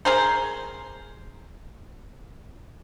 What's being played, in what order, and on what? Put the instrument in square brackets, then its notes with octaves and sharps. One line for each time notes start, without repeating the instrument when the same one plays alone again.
[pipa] G#4 A#4 C5